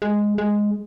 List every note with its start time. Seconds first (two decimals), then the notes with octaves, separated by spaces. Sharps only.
0.02 G#3
0.38 G#3